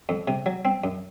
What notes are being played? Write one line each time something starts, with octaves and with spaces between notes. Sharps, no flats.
F2
C3
F#3
C4
F#2